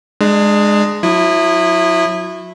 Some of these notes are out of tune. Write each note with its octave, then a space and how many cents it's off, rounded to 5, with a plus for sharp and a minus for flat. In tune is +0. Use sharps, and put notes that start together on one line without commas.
G#3 +0 D4 +30
F#3 -35 E4 +0 D#6 -25